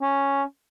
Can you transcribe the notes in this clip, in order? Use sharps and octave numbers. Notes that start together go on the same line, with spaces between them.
C#4